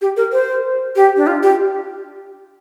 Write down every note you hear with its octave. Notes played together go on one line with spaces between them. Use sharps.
G4
A#4
C5
G4
D4
F4
G4